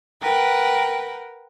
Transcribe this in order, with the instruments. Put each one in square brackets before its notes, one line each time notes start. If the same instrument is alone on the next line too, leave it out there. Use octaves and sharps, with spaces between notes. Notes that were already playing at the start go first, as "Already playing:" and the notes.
[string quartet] A#4 B4 F#5 G5